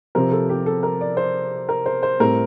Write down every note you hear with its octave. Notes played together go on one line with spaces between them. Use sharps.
C3 F3 C4 A#4
A4
G4
A4
A#4
D5
C5
A#4
C5
C5
A2 G3 C4 A#4